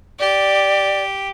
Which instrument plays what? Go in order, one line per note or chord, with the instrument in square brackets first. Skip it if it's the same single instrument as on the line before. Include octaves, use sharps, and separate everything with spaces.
[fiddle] G4 [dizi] D5